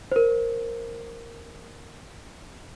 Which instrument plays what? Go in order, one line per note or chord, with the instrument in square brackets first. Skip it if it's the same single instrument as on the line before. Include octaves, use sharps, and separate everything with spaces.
[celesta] A#4 C5